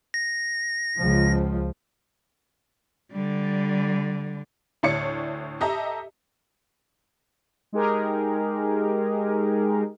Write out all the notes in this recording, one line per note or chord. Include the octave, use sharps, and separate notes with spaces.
A#6
C#2 F3
D3 G3
D2 A2 C#5 D5 C#7
G4 A4 D#5 E5 A#5
G#3 D#4 G4 G#4 A#4